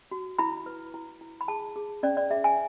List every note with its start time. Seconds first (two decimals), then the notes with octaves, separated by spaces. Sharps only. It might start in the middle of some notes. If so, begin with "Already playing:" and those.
0.11 F#4
0.39 E4 B5
0.66 B4
0.94 E4
1.21 E4
1.41 B5
1.48 G#4 A5
1.76 G#4
2.03 C#4 D5
2.17 D5
2.30 G#4 E5
2.44 G#5